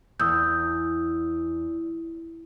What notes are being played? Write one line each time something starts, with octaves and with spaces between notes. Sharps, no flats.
E2 D#6 E6 G6